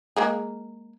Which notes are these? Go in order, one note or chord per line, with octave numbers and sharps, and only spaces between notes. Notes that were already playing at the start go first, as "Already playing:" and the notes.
G#3 A#3 G#4